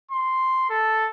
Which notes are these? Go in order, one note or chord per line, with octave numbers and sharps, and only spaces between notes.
C6
A4